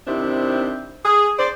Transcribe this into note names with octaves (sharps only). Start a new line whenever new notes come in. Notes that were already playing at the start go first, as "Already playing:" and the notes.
C3 D#3 C4 D4 E4
G#4
C5 D5